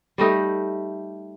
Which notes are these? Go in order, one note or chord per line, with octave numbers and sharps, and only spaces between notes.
G3 A3 D#4 G4